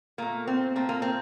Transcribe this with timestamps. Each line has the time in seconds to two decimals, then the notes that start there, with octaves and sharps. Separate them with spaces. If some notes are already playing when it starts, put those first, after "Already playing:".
0.18 A#2 A3 A#3
0.47 C4
0.76 A#2 A3 C4
0.89 A#3
1.02 C4